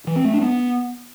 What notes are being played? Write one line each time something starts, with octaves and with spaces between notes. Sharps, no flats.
E3
C4
A3
D4
B3